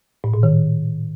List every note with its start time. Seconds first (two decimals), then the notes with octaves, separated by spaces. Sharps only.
0.24 A2
0.34 A#2
0.43 D#3